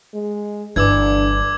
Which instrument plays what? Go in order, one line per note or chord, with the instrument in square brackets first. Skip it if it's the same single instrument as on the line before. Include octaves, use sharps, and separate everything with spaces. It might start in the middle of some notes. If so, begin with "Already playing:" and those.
[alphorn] G#3
[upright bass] G1 [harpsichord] E3 [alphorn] D4 [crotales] D6 E6 G#6